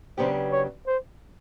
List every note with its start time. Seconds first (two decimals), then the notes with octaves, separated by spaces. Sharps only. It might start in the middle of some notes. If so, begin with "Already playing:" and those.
0.18 C#3 F#3 B3 D4 G4 C5
0.52 C#5
0.87 C5